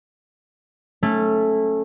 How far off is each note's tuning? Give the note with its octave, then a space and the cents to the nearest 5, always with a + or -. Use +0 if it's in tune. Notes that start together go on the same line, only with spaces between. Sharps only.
A3 -5 C#4 -20